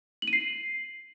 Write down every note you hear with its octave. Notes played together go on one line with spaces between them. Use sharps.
F#7
D#7
C7